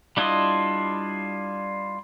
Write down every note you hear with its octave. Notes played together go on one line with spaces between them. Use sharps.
G3 D4 E4 F4 D#5